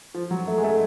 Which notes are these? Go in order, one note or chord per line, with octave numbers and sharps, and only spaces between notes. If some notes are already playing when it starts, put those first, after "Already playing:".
F3
F#3
A3
G#3
A3